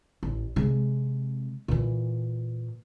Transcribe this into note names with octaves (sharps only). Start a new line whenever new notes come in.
A1
C3 G#3
A#2 E3